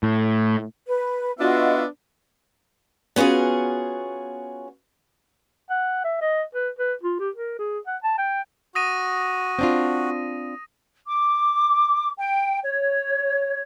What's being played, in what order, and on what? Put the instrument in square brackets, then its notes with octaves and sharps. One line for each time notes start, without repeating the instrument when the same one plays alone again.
[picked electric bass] A2
[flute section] B4
[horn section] B3 D4 E5 [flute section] F4 F#4 D#5
[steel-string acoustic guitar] B3 C#4 F4 F#4 G#4
[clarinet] F#5
E5
D#5
B4
B4
F4
G4
A#4
G#4
F#5
A5
G5
[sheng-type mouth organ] F#4 [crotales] D#6 A#6 D#7
[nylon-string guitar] C4 D4 F4
[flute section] D6
G5
C#5